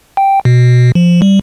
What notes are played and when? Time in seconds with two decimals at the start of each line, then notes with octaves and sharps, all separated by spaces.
0.17 G5
0.45 B2
0.95 F3
1.22 G3